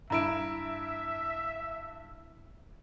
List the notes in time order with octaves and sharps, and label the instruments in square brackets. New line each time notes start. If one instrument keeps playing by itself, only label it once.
[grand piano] G2 E4 E7 [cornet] E5 [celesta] A#5 B5 D7